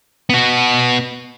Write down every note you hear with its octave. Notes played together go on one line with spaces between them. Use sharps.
B3 F#4